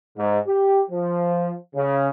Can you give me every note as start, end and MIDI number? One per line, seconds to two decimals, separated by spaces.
0.18 0.38 44
0.47 0.81 67
0.90 1.54 53
1.75 2.08 49